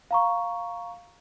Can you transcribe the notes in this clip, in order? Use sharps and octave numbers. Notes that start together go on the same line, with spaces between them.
F5 A#5 C#6